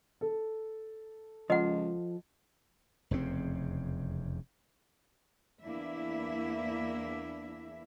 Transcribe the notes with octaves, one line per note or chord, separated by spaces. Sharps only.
A4
C#2 F3 D#5 F#5
F1 E2 C#3 C4
E2 A#3 D4 E4 E5